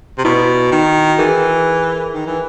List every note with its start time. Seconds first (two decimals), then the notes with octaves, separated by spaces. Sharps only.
0.18 C3
0.24 B2 E4 F#4
0.72 D#3
1.19 E3 G#4 A#4
2.14 D#3
2.26 E3